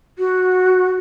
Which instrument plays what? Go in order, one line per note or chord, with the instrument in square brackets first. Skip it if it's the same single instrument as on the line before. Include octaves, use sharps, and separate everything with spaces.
[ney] F#4